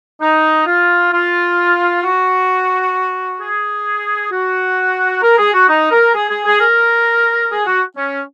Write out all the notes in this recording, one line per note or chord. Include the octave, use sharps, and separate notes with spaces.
D#4
F4
F4
F#4
G#4
F#4
A#4
G#4
F#4
D#4
A#4
G#4
G#4
G#4
A#4
G#4
F#4
C#4